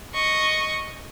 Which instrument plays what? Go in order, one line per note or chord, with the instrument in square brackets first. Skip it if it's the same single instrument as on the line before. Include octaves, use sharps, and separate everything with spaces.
[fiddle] D#5 C#6